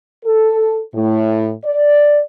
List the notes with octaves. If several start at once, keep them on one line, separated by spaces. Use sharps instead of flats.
A4
A2
D5